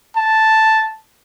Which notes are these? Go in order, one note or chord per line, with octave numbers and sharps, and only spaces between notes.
A5